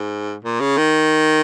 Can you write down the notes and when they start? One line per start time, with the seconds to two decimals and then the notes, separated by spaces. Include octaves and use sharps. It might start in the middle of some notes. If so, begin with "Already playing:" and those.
Already playing: G#2
0.44 A#2
0.60 C#3
0.77 D#3